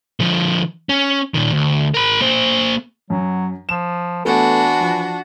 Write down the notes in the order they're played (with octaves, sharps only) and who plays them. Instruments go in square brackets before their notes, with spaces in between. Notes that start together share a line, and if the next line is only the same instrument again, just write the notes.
[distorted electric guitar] D3 F3
C#4
A#2 D#3
D2
A#4 B5
A#3 C5
[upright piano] F#2 [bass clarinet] F#3
[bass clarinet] F3 [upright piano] E7
[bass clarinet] E3 [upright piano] A3 B3 [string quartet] D4 F#4
[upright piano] F3